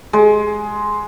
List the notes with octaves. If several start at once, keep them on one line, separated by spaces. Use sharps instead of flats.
G#3